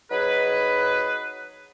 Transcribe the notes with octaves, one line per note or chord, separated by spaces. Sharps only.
F#3 D#4 G#4 B4